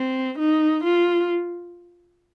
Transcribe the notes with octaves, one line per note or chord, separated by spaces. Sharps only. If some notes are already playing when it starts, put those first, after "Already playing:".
Already playing: C4
D#4
F4